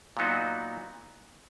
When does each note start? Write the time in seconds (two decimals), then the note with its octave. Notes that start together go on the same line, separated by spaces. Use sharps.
0.17 A#2 F#3 B3 D#4 F#4